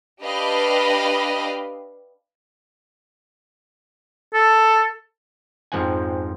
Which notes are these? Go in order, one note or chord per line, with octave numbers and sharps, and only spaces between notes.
D4 G4 B4 D#5 F5 B5
A4
F2 G#2 F3 C4 F#5 G#5